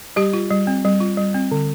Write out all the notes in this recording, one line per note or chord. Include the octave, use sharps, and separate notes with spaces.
G3 G4
F4
G3
C4
G3
F4
G3
C4
D3